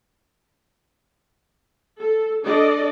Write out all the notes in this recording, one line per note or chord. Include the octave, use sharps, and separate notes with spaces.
A4
D4 A4 D5 D#5